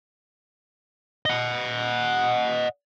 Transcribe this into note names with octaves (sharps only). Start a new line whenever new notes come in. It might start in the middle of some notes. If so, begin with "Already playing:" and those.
D#5 F#5